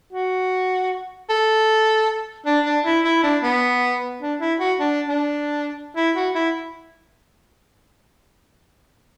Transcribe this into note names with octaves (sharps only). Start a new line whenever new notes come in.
F#4
A4
D4
D4
E4
E4
D4
B3
D4
E4
F#4
D4
D4
E4
F#4
E4